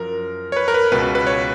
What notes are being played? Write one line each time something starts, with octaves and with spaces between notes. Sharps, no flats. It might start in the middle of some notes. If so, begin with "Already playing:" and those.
Already playing: F#2 F3 A#4
C#5
B4
A#4
B4
C#2 B2 B4
B4
C#5